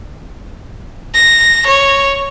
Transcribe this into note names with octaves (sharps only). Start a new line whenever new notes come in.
A#6
C#5